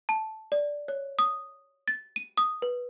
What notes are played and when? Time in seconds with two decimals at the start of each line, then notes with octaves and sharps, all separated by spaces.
0.09 A5
0.52 D5
0.88 C#5
1.19 D#6
1.88 A6
2.16 D#7
2.37 D#6
2.62 B4